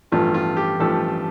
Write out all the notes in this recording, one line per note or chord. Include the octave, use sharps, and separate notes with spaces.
A1 G2 F3 A3 F4
F4
G4
A1 G2 F3 A3 A4